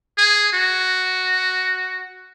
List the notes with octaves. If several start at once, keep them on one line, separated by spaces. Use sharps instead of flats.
G#4
F#4